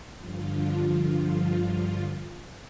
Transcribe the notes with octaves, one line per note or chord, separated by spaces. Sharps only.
G2 D3 F3 F4